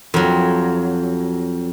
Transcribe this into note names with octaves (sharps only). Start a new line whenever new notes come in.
F2 F#3